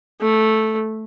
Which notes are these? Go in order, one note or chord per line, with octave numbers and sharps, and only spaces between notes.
A3